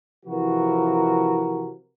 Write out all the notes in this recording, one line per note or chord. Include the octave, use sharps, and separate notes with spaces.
C3 E3 F3 F#4 A#4